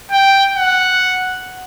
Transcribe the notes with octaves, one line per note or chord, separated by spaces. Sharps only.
G5
F#5